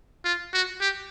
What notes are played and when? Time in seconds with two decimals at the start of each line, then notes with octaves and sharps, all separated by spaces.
0.25 F4
0.53 F#4
0.81 G4